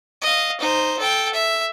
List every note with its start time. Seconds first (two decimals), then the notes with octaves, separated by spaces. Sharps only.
0.22 D#5 F5
0.60 D#4 C5
0.99 A4 G5
1.34 E5